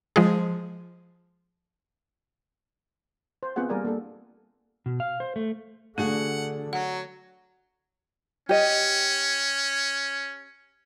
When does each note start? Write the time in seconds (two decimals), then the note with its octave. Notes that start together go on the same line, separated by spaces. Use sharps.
0.16 F3 G#3 G#4
3.43 C5
3.56 B3 C4 F4 G#4 F#5
3.69 G3 A#3 G#4 A#4 D5 G#5
3.85 A#3 D4 A4
4.86 B2
5.00 F5
5.20 C5
5.36 A3
5.98 D3 A3 D4 F#4 G#4 F#5
6.73 F#3 F#5
8.49 C#4 G4 D#5